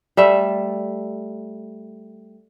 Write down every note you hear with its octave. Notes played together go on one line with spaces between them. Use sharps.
G3 A3 E5